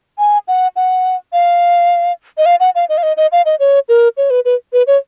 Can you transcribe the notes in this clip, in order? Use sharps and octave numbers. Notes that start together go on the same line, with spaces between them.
G#5
F#5
F#5
F5
D#5
F5
F#5
F5
D#5
F5
D#5
D#5
F5
D#5
C#5
A#4
C#5
B4
B4
B4
C#5